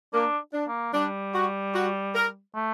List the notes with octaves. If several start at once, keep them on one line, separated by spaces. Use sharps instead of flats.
A#3 D4
D4
A#3
G3 D4
F#4
F#4
A#4
A3